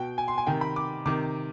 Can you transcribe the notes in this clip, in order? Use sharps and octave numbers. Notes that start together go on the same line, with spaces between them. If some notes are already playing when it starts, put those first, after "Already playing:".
Already playing: B2 G5
G#5
C6
G#5
C3 D#3 G5
B5
D6
C3 D#3 D6